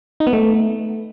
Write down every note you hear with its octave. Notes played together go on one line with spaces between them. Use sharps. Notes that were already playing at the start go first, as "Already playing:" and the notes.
D#4
B3
A3